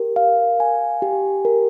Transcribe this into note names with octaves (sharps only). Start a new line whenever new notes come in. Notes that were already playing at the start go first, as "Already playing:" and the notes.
Already playing: G4 A#4
F5
G#5
G4
A#4